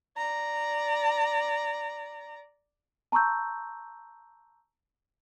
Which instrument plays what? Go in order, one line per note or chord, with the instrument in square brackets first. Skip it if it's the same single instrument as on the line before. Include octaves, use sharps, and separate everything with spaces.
[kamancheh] D5 A#5
[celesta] A5 A#5 C6 C#6 E6 G6